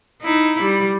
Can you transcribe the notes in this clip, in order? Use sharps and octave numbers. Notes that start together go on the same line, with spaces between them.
D#4 E4
G3